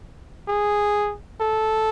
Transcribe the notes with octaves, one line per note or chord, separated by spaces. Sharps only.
G#4
A4